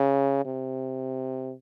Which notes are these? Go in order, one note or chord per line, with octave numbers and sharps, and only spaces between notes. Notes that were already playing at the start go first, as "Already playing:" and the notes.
Already playing: C#3
C3